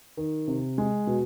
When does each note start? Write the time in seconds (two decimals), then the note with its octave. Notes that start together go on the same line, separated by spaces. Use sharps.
0.17 D#3
0.48 C3
0.78 G#3
1.07 B2